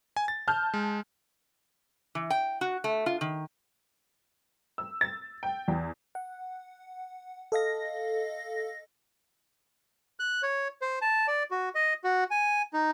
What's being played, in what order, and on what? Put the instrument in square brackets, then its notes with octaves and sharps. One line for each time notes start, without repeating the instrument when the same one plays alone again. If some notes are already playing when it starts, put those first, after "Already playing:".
[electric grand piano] G#5
A6
[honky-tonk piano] A5 F6 G6
[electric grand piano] G#3
[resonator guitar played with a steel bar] E3
G5
F#4
A3
F4
D#3
[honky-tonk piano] E6
A6
G5
E2
[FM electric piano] F#5
A4 D#5 F5 A#6
[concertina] F#6
C#5
C5
A5
D5
F#4
D#5
F#4
G#5
D#4